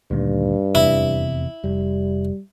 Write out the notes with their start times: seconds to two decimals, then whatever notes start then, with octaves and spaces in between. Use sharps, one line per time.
0.11 D2 G2 A#2 D#3
0.75 F1 E2 C3 E4
1.64 F1 G3